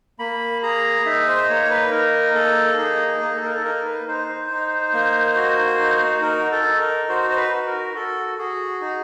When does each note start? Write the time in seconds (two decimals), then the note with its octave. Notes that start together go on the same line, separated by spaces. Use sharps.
0.19 A#3 B5
0.63 G#4 A#5
1.06 D#4 E5
1.28 C5
1.49 A#3 C#5
1.70 B4
1.91 D#4 A#4
2.35 A#3 A4
2.77 D#4 G#4
3.07 G#4
3.20 A#3
3.36 A4
3.45 A#4
3.53 A4
3.64 D#4 A#4
3.85 B4
4.08 D#4 C5
4.28 C5
4.51 D#4
4.93 A#3
5.36 F#4
5.79 D#4
6.22 D#4 A#4
6.52 A4
6.65 D#4
6.80 A#4
7.09 F#4 C5
7.31 C5
7.37 B4
7.52 F#4
7.67 A#4
7.94 F#4 A4
8.38 F#4 G#4
8.81 D#4 G#4